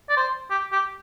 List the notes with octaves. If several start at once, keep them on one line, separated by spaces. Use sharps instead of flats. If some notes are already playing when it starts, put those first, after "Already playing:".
D5
C5
G4
G4